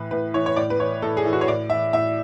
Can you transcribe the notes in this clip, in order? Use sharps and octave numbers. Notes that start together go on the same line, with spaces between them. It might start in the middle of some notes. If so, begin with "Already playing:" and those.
Already playing: A2 E3 B4
A2 B4
E3 C#5
C#5
A2 D5
B4
E3 C#5
A2 A4
G#4
E3
F#4
C#5
A2 D5
E3 E5
A2 E5